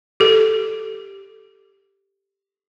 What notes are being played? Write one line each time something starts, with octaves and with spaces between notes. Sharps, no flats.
G4 A4